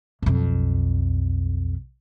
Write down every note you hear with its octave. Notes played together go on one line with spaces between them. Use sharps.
B1 F2